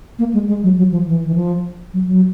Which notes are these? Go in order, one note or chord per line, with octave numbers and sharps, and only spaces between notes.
A#3
G#3
G#3
F#3
F#3
F3
E3
E3
F3
F#3
F#3